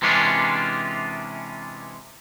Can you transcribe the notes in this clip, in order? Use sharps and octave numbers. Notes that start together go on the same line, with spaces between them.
C3 E3 G#3 C#4 D4 F4